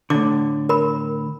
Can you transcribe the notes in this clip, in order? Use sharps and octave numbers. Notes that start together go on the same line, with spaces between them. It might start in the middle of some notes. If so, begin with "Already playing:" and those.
A2 D3 D6
A#4 B5